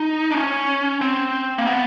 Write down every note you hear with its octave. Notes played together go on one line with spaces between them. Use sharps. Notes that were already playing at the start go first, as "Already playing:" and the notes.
Already playing: D#4
D4
C#4
C4
A#3
B3